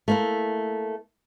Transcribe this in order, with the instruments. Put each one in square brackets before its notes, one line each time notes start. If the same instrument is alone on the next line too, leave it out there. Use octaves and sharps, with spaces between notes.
[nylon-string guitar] A3 A#3 E4